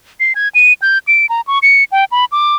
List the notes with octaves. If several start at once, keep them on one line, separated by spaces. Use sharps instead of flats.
C7
G#6
D#7
G6
D7
A#5
C#6
C#7
G5
B5
D6